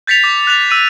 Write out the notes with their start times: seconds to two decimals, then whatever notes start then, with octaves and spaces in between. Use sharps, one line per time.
0.07 G6 A6 B6 C#7 F7
0.24 D6
0.47 F#6 A6 F7
0.71 E6 D#7